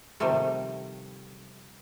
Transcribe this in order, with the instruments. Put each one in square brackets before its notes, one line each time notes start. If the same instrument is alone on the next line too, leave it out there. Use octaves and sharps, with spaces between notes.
[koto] C3 D#3 F3 G3 A3